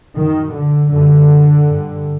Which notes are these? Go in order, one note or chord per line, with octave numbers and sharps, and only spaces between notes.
F#2 D#3
D3
F#2 D3
G2